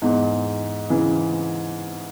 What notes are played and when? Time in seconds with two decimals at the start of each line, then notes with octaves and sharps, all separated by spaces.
0.02 E2 G#2
0.90 C#3 E3